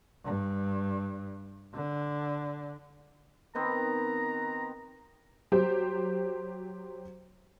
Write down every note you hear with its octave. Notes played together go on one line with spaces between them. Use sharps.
G2
D3
D#3 B3 C4 A#5
F#3 G4 C5